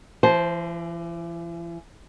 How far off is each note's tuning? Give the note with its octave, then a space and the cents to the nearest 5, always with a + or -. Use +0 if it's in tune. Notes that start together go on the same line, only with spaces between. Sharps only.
E3 +40 C5 +0 A5 -30